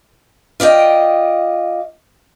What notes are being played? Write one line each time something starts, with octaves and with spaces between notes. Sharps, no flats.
F4 D5 D#5 G5